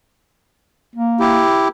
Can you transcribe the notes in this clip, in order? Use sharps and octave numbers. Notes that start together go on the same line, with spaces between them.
A#3
E4 G4